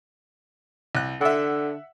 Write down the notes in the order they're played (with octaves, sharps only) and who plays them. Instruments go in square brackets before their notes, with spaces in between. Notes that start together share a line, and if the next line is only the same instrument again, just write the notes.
[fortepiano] C2 F#6
[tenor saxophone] D3 [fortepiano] E5 F#5